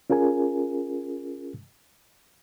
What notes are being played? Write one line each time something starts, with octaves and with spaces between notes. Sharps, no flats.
C#4 F4 G#4 A#4 G#5